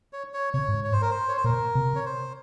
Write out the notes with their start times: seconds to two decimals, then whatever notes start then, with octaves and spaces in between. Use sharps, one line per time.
0.13 C#5
0.34 C#5
0.53 C3 C#5
0.68 G#2
0.84 C#5
0.93 C5
1.02 A#4
1.10 C5
1.29 C#5
1.37 C5
1.44 A#2 A#4
1.75 C3
1.96 C#5
2.06 C5